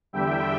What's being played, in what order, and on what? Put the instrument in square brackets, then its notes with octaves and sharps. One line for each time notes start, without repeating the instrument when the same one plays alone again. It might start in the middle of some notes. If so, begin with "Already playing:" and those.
[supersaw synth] E2 D3 G3 E5 G5